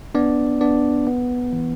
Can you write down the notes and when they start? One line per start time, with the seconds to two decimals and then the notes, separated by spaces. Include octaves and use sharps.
0.15 B3 D4 D5
0.61 B3 D4 D5
1.07 B3
1.53 E3